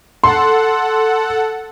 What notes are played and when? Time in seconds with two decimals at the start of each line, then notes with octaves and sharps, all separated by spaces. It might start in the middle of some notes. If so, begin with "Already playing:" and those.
0.24 A4 F#5 C6